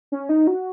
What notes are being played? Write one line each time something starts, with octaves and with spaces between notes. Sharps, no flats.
C#4
D#4
F#4